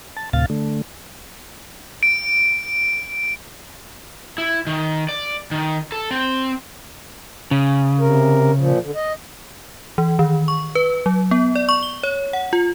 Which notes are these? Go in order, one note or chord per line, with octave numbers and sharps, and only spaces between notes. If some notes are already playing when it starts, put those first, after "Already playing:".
A5
D2 A2 C3 F5 A6
D3 A3
D7
E4
D#3
D5
D#3
A4
C4
C#3
C3 A#4
A#2 F3
D3
D#5
E3
D#3
C#6
B4
F#3
B3
D5
C#6
G7
C#5
F#5
F4